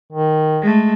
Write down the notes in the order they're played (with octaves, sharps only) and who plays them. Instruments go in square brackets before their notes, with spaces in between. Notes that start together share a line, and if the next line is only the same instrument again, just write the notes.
[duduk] D#3
[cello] G#3 A3